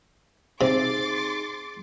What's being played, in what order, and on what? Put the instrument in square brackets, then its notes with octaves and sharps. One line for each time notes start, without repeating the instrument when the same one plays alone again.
[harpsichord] C3 [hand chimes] D#4 G#4 [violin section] C6 D6 A6